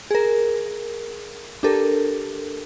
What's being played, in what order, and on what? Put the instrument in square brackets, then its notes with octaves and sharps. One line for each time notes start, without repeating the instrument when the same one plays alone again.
[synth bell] G#4 A#4
D4 G4 A4 A#4